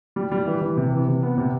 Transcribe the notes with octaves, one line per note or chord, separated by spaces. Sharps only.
G3
G3
E3
E3
C3
E3
C3
B3
C3